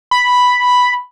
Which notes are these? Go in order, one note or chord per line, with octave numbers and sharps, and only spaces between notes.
B5